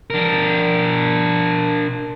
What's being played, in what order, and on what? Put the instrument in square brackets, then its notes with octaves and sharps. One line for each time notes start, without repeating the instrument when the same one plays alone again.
[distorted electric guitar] D4 A#4